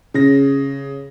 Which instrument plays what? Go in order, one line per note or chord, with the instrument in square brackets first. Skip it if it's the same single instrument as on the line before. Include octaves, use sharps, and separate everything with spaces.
[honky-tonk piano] C#3 A#6